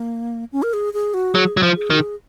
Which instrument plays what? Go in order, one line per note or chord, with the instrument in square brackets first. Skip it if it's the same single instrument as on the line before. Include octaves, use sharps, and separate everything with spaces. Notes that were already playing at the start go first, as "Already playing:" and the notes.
Already playing: [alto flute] A#3
C#4
A#4
G#4
G#4
F#4
[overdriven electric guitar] F#3 [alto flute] G#4
[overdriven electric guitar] F#3
F3
[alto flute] G#4
[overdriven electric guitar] D#3 [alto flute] F#4
[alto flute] G#4